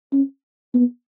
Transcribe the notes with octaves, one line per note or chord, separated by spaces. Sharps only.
C#4
B3